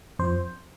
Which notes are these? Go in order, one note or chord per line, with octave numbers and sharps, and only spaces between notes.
F2 F3 C5